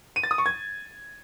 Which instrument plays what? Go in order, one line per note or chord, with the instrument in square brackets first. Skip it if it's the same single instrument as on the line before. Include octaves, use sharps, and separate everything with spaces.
[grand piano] D#7
A6
D#6
C#6
G#6